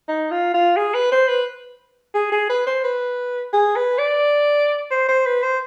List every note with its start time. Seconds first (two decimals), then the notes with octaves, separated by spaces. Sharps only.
0.08 D#4
0.31 F4
0.54 F4
0.77 G#4
0.94 B4
1.12 C5
1.28 B4
2.15 G#4
2.32 G#4
2.49 B4
2.67 C5
2.84 B4
3.53 G#4
3.76 B4
3.98 D5
4.91 C5
5.08 C5
5.26 B4
5.43 C5